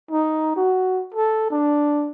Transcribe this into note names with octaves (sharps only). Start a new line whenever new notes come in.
D#4
F#4
A4
D4